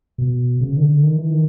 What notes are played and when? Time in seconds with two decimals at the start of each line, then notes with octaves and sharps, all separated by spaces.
0.18 B2
0.61 C#3
0.77 D#3
0.82 D3
1.03 D#3
1.16 E3
1.30 D#3